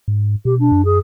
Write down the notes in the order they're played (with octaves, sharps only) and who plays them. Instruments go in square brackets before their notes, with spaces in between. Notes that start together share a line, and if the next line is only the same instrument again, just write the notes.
[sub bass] G#2
[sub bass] B2 [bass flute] G4
[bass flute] D4
[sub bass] F#2
[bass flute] G#4